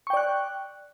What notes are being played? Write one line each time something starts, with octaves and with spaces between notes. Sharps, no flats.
D5 G5 C#6 F#6